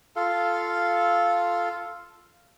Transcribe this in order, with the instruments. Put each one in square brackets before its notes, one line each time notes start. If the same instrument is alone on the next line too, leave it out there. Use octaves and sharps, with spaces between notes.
[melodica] F4 A4 F5